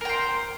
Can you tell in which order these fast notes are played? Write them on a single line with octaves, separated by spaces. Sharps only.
A#4 G5 C5